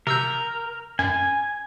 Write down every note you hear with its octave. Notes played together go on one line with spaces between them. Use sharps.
C3 A#4 E6 G6
F#2 G#5